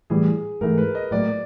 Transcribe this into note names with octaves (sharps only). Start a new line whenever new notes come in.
A2 E3 G3 G#4
G#2 E3 A3 A#4
B4
D#5
A2 F#3 A#3 D5